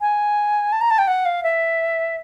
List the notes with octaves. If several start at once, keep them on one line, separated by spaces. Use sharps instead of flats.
G#5
A5
A#5
A5
G5
F#5
F5
E5